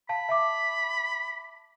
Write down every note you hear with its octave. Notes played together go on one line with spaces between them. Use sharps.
F5 A5 B5
E5 A5 D6